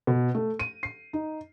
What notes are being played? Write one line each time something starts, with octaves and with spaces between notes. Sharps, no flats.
B2
A3
D#7
C7
D#4